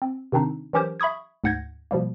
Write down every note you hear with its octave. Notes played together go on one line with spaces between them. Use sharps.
C4
C3 D#3 C4 D4 D#4
E3 F#3 C#4 G4 A#4 C5
E5 B5 C#6 D#6 G#6
D2 G#2 F#5 G6 G#6 A#6
B2 F3 G3 A#3